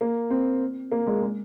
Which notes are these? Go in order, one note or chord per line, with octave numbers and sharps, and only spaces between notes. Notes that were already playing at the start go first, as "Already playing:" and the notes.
A#3
C4
A#3
G#3
G#3